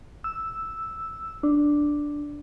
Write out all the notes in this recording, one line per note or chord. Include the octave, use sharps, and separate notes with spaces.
E6
D4